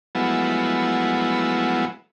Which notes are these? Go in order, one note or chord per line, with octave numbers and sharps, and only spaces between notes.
F3 F#3 G#3 A3 B3 E4